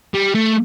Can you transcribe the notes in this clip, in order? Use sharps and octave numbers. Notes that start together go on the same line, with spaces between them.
G3
A3